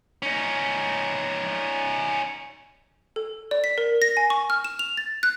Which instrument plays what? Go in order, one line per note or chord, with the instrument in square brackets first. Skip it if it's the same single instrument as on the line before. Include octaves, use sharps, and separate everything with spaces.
[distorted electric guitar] C#4 D#4
[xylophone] A4
D5
B6
A#4
A#6
G#5
C#6
F6
E7
F7
A6
F#6